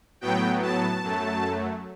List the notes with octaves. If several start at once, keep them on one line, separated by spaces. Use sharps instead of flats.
A2 F#3 B3 G5
A5
F#2 F#3 A3